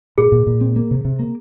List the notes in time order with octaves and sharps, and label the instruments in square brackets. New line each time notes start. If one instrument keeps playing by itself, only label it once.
[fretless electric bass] A#2 [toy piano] G#4
[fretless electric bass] A#2
A#2
C4
A#3
C3
C3
A#3